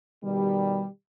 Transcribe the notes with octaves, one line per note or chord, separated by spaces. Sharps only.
B2 D#3 G3